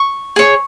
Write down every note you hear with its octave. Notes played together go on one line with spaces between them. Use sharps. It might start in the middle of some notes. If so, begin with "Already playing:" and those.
Already playing: C#6
G#4 C#5